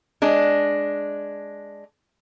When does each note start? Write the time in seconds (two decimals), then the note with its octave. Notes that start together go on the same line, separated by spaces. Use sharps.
0.22 G#3 D4